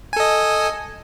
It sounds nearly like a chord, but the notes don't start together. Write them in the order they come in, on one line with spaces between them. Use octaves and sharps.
G#5 A4 D#5